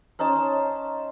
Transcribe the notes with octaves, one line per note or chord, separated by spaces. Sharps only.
C#4 D#4 C5 A5